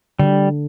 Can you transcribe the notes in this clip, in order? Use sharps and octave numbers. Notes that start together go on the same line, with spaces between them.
D3 G3